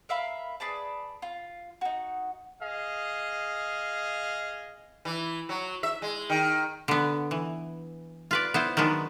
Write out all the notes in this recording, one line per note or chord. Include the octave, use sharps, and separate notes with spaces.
A#4 E5 F5 B5
G#4 B4 D5 A5
F4
D#4 F#4
G#4 D#5 F5
E3
F#3
E5
G#3
D#3
D3 B3
E3
F4 B4 D5
B3 E4 C5
D#3 F#3 G#3 B3 D4